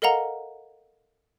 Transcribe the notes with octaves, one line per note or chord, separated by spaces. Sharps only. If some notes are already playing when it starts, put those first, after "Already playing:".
A4 A#4 D#5 F5 F#5 A#5